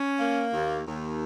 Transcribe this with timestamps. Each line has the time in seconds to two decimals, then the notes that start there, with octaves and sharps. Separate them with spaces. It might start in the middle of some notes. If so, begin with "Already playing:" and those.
Already playing: C#4
0.20 A#3
0.52 D#2
0.85 D#2